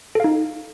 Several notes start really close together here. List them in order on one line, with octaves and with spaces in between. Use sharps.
A4 F5 D#4